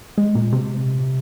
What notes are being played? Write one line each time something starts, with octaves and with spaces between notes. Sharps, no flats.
G#3
A#2
C3